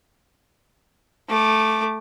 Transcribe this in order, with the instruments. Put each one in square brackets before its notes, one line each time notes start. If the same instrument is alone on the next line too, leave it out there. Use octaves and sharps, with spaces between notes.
[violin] A3 D6